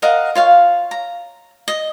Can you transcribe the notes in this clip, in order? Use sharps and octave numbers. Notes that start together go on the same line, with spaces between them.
A#4 D#5 F5 F#5
F4 C#5 F5
A#5
D#5